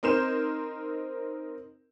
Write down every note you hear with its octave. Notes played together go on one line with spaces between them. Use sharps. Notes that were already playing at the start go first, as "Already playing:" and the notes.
C4 D#4 A#4 C6 G6 E7